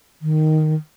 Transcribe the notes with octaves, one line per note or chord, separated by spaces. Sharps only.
D#3